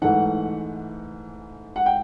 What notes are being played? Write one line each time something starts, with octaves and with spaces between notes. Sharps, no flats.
G#2 E3 A3 F#5
F#5
G5